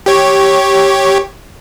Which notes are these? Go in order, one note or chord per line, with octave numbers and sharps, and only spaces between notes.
G4 C#5